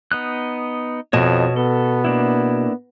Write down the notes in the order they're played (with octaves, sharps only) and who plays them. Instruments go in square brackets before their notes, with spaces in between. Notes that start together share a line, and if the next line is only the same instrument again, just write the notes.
[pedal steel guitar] B3 D#4 F#6
[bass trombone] F2 [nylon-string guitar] B2 [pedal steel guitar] C#5 D#5 A5
[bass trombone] B3 [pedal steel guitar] A4
[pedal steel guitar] A#3 D4 E4